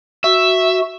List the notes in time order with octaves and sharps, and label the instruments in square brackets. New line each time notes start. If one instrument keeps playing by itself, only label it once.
[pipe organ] F#4 [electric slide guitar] E5